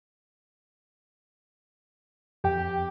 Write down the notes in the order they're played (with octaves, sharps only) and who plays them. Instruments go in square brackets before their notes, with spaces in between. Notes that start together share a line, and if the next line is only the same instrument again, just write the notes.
[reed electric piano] F2 G5 [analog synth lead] G4